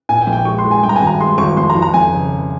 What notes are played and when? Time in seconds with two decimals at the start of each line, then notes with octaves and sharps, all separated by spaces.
0.09 A#2 G#5
0.21 G5
0.27 A#1
0.33 G5
0.45 G#3 C#6
0.59 C6
0.65 G#3
0.71 G#5
0.83 G2 G5
0.89 A#5
0.96 G#1 G#5
1.07 A#5
1.20 G#3 C6
1.38 G#1 C#6
1.57 F2 C6
1.70 A#5
1.75 F3
1.82 A#5
1.94 F2 G#5
2.13 C#3